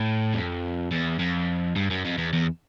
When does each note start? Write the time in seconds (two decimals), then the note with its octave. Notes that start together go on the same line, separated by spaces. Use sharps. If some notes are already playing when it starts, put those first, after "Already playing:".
Already playing: A2
0.34 F2
0.92 E2
1.19 F2
1.76 G2
1.90 F#2
2.05 F2
2.18 E2
2.33 E2